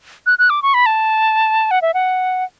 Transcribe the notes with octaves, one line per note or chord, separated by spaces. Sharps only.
F#6
F#6
D6
C#6
B5
A5
F#5
E5
F#5